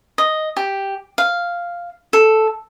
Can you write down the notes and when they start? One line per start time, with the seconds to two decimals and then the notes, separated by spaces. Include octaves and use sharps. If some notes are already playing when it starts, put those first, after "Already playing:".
0.18 D#5
0.56 G4
1.18 F5
2.13 A4